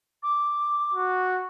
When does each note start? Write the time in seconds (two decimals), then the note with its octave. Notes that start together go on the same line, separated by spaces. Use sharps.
0.23 D6
0.94 F#4